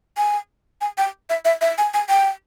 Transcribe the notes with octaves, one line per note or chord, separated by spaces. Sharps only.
G#5
G#5
G5
E5
E5
E5
G#5
G#5
G5